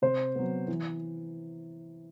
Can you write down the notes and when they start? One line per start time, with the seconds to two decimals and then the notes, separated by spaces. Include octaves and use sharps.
0.02 C3 C5
0.35 F#3 B3
0.68 E3